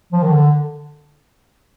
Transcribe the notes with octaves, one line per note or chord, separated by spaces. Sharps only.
F3
D#3
D3